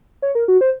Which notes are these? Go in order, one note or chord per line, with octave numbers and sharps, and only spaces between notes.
C#5
A#4
F#4
C5